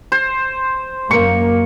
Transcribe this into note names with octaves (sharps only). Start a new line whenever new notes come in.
C5
F#2 A#3 C#6